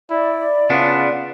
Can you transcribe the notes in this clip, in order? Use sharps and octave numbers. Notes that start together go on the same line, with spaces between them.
E4 D5
C#3 B3 D4 F4